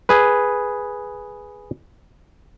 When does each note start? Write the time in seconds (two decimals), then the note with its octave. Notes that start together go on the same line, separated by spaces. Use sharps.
0.09 G#4 B4